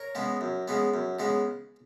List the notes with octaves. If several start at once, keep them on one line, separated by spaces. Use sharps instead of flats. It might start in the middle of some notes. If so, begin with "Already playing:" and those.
Already playing: A#4 C#5
C#3 G#3 B3
F#2
C#3 G#3 B3
F#2
C#3 G#3 B3